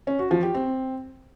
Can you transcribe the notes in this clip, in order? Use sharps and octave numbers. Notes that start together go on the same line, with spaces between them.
C#4
F#4
F3
G4
C4